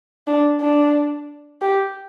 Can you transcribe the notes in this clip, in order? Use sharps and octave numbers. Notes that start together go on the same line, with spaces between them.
D4
D4
G4